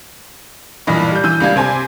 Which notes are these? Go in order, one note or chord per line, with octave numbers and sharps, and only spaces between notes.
B1 G2 A#2 E3 D#5 B5
G3 G6
E3 E6 G6 D#7
C#2 G3 A#3 D4 F5 G#6
C3 C4 G#5